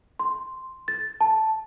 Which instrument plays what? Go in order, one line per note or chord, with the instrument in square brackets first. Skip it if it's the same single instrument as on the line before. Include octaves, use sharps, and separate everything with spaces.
[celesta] C6
A6
A5